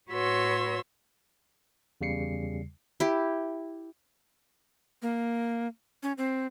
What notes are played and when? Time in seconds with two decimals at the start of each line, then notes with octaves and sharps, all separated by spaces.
0.10 A2 F#4 B4 C#5 C6 E6
2.01 E2 C#3 G3 C7 C#7
3.00 E4 G4
5.02 A#3
6.03 C#4
6.18 C4